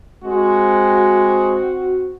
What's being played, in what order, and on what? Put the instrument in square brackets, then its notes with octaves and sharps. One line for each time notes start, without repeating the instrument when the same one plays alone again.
[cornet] G#3 [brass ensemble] C4 F#4